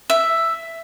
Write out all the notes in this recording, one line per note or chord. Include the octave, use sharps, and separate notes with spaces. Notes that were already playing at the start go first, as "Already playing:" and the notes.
E5